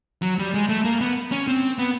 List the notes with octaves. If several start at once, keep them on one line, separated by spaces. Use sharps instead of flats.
F#3
G3
G#3
A3
A#3
B3
C#4
C4
B3